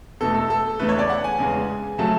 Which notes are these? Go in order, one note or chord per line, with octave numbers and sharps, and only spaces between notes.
E2 B2 A3 A4
A4
A4
E2 C#3 E3 A3 B4
C#5
D5
F#5
G#5
E2 C#3 G#3
C#3 F#3 A3 A5